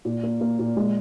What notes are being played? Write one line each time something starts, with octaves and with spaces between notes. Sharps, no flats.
A#2
A#3
A#3
A#2
G#3